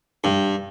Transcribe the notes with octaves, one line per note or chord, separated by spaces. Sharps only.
G2